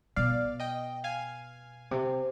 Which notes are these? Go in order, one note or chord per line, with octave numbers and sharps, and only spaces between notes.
B2 D5 F5
D#5 G5
F5 G#5
C3